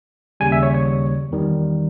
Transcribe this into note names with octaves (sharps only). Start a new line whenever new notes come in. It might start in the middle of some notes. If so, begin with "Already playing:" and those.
D#2 C#3 G3 G#5
E5
C#5
C#5
E2 D#3 G3